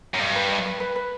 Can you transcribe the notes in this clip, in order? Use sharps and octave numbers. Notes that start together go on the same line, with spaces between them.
F#2
G2 D#5
B4
D#5
B4
B4
B4